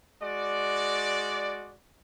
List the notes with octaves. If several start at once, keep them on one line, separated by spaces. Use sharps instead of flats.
G#3 F#4 D5